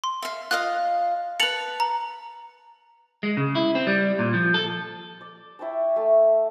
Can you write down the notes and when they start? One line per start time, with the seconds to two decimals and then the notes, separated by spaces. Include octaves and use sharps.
0.04 C6
0.22 E5 F5
0.51 F4 D#5 F5 F#6
1.40 B4 A5 C#7 F7 F#7
1.80 A#5
3.23 G#3
3.37 C#3
3.55 E4
3.75 C4
3.87 G3
4.19 A#2
4.34 F3
4.54 A4
5.21 D5
5.59 E4 C#5 G5 A5
5.96 A3 A5